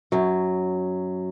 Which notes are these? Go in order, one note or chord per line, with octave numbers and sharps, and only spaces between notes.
F#2 F#3